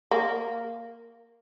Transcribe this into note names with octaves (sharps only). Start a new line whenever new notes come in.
A#3